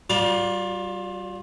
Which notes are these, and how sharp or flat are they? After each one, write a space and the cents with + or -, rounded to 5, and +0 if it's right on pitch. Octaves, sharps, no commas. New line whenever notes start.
G3 -35 F4 +25 D5 +0